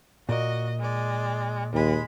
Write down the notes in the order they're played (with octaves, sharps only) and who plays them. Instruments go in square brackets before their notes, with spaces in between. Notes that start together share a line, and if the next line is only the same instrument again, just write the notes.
[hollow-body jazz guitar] A#2 A#4 [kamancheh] F#4 D#5
[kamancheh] G#3 D5
[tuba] D#2 [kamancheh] G#3 B5